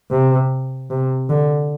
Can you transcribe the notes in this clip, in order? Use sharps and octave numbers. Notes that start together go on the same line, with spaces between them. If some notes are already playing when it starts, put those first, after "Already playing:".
C3
C3
D3